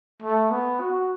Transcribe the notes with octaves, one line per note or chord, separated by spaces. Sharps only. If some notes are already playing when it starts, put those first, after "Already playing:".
A3
B3
F#4